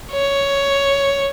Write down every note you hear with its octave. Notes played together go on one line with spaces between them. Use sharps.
C#5